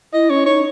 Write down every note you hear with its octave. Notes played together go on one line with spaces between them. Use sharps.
E4 D#5
C#4 C#5
D#4 C#5